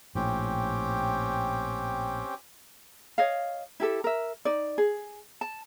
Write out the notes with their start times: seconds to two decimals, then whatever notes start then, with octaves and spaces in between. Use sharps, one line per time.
0.15 A#1 A2 C4 C#4 G4
3.18 C#5 D#5 F5
3.80 E4 G4 A4
4.04 A#4 E5
4.45 D#4 D5
4.78 G#4
5.41 A5